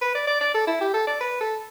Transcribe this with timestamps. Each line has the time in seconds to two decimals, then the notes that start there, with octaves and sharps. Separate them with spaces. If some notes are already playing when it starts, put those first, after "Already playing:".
0.02 B4
0.15 D5
0.27 D5
0.41 D5
0.54 A4
0.67 E4
0.81 G4
0.94 A4
1.07 D5
1.21 B4
1.41 A4